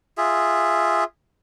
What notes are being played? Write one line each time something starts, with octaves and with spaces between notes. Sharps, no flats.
F4 G#4 E5